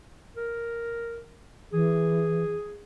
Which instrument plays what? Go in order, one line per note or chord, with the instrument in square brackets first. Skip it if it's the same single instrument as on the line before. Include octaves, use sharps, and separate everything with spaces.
[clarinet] A#4
[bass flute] E3 [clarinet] G#4